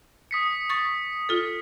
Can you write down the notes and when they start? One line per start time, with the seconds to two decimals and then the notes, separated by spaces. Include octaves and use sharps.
0.31 D#6 B6 C#7
0.70 C#6 A6
1.29 F4 A4